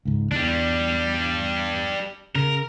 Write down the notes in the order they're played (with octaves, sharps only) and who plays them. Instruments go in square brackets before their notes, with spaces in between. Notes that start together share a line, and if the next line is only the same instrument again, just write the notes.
[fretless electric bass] C#2 G#2
[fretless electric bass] E2 [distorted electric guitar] G3 D4
[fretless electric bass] C#3 [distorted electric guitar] A#4